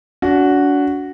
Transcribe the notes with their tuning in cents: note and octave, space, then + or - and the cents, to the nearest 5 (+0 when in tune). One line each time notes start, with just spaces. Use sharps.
D4 -40 F#4 +0